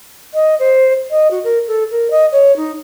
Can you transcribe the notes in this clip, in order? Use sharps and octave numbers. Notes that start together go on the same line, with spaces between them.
D#5
C5
D#5
F#4
A#4
A4
A#4
D#5
C#5
D#4